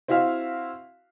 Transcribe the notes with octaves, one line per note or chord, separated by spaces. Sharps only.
C4 E4 F#4 E5 F5